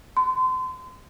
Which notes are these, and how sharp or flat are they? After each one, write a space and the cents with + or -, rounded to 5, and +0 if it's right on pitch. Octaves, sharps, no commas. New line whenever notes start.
C6 -35